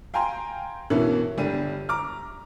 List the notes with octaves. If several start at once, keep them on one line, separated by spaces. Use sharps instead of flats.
F5 G5 G#5 A#5 C6
G2 B2 E3 A#3 B3 C#4
G1 G3 D4 G4 D#7
A#5 D6 F6